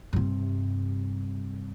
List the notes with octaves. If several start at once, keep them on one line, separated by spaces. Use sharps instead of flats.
G2 C3